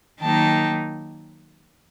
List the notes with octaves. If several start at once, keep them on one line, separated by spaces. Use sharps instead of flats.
D#3 F#3 A#3 D#4 G5 A5